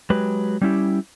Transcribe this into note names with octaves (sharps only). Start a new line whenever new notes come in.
F#3 G#3 G4 B4
G3 C#4 E4 G4